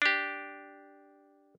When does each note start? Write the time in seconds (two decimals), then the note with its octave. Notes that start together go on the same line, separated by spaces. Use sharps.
0.02 D4 G4